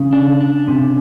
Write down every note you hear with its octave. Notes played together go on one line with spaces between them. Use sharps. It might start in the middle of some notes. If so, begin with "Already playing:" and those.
Already playing: C#3 C#4
D4
D4
C3